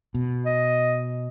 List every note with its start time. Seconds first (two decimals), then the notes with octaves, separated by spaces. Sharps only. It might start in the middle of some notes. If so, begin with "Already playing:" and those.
0.15 B2
0.46 D#5